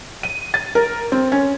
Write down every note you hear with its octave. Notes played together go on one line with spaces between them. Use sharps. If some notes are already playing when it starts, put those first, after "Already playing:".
D#7
A6
A#4
C4
C#4